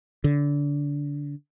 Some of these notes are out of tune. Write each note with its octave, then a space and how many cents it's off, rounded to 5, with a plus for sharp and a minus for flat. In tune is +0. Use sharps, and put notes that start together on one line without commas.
D3 -25